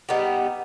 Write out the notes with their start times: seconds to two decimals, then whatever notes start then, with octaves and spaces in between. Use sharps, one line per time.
0.09 G3 B3 D#4 G4